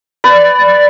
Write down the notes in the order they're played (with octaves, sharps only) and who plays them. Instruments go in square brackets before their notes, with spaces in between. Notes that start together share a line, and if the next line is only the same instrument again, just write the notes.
[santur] B4 [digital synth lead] D5